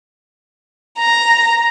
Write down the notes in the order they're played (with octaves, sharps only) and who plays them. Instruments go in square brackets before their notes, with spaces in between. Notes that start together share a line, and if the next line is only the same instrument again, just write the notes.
[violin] A#5